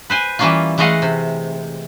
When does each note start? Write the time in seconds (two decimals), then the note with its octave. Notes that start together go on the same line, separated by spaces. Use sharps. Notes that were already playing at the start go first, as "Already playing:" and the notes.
0.10 B4 C5 G#5
0.39 E3 G3 A#3 C#4 F4
0.78 E3 G#3 A3 D#5 F5 F#5
1.02 C3